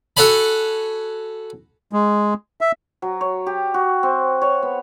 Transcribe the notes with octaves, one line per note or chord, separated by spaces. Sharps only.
F#4 A4 C#5 G#5 B5
G#3
E5
F#3
C#5
G4
F#4
C4
C#5
B3